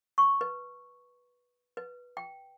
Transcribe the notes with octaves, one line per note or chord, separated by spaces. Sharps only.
C#6
B4
B4
G5